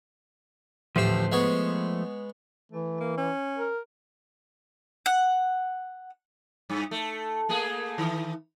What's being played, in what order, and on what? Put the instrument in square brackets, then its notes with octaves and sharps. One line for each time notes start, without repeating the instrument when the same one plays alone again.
[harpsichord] A1 D2 G4 [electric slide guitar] F3 A3 C5
[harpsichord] G#3 B3 C#5
[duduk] E3 [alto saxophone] A3
[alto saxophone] A#3
C#4
[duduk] A#4
[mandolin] F#5
[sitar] G2
A3
A3 A#3 G#4
D#3 E3